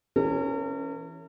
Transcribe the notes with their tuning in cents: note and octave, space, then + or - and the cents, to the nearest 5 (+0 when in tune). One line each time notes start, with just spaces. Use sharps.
E3 +0 C#4 +0 A#4 -40